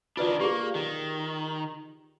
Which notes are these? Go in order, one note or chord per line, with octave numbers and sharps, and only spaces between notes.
D#3 D4 F4 B4 D5
A#3 G4 G#4
D#3